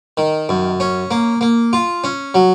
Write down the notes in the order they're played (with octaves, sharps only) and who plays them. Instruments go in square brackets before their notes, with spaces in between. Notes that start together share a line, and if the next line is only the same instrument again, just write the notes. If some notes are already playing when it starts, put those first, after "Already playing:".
[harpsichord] D#3
F#2
C#4
A#3
A#3
F4
C#4
F#3